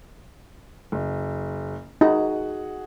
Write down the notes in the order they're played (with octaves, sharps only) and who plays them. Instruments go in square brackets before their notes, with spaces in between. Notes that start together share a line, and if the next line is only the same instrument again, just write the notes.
[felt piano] F#1
[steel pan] D#4 [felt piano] F#4 G#4 F#5